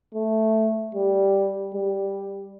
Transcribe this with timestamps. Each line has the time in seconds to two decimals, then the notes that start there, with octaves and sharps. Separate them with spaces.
0.14 A3
0.95 G3
1.74 G3